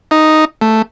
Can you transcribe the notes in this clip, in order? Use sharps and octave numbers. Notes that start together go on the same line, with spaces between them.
D#4
A3